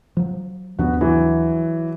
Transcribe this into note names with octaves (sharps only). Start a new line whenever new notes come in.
F3 F#3
D#2 F3 B3 D4 F#4
E3 F#3